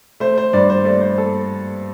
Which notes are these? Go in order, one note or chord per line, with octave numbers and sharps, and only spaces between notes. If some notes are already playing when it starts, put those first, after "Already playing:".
A3 C5
C5
G2 D5
C5
A3 D5
C5
A4